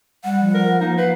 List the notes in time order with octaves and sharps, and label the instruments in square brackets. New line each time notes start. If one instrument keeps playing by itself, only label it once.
[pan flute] G3 [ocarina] F#5
[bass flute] F3
[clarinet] A#4
[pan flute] A#3 [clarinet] D#4
[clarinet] B4 [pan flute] F5